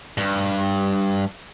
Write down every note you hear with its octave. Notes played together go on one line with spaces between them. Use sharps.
G2